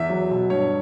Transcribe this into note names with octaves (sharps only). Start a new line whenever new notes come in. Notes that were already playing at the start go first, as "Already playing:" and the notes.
Already playing: E2 E5
F#3
B2
G2 C#5